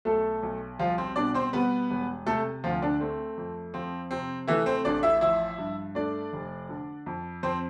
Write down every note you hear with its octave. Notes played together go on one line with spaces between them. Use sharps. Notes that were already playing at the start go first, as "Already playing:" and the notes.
B1 A3 A4
B1
F3 G3 F4
C4 C5
B2 D4 D5
C4 C5
G3 B3 B4
E1
C3 A3 A4
D2 F3 F4
D3 D4
A3 C4
F2
F3 C4
C3 C4
E3 A3 E4
C4 C5
A1 D4 D5
E4 E5
F3 E4 E5
G2
A3 D4 D5
F1
D3
F2
F2 C4 C5